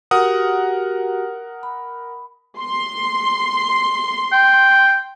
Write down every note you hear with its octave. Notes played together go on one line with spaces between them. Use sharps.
F#4 G4 A#4 F#5 D#6
B5
C6
G5